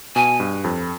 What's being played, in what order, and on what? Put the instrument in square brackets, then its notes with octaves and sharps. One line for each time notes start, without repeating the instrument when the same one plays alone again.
[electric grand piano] B2 [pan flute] G#5
[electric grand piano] G2
F2